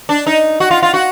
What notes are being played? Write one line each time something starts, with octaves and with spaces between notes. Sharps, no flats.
D4
D#4
F#4
F4
F4
F#4